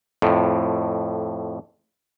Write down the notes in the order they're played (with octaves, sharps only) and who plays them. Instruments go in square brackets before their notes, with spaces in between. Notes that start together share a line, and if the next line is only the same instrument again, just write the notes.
[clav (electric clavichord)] F2 A2